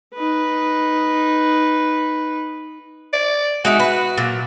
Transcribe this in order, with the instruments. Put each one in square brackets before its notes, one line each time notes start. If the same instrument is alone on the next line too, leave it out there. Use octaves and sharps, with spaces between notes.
[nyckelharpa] D#4 B4
[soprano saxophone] D5
[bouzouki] G#3 D#4 E5 [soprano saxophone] F#4
[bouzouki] B4
A#2 F#3